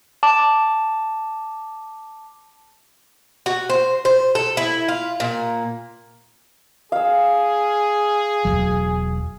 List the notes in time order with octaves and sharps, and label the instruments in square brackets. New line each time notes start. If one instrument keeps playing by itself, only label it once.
[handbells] A5 D6
[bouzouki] F#4
C5
C5
A4
E4
F4
A#2
[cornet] G#4 [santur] F5 E6
[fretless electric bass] E1 C#2 F#3